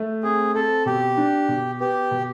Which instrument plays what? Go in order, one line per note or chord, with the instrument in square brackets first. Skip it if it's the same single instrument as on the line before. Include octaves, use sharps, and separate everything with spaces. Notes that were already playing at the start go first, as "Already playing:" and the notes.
Already playing: [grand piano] A3
[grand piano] C4 [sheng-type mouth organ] G#4
[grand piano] C4 [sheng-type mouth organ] A4
[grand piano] B2 [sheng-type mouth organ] G4
[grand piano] D4
B2
[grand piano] B3 [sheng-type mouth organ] G4
[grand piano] B2